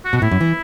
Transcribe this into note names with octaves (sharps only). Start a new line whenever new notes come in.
F#4
B2
F#4
A2 E4
F#2
E3